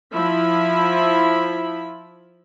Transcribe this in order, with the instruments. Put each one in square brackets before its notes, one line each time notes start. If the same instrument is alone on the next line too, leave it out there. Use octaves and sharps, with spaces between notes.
[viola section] F3 E4 B5